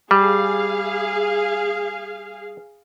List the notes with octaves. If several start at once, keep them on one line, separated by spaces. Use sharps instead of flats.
G3 G#4 F5